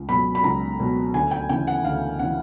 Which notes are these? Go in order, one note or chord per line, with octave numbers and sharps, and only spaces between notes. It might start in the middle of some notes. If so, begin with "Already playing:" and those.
Already playing: C#2
B2 F#3 B5
B5
C#2 A#5
B2 F#3
D2 G#5
G5
C#3 E3 G5
F#5
D2 F5
C#3 E3 F#5